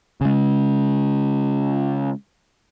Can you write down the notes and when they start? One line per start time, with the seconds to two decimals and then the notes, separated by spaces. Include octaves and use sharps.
0.21 C#3 G#3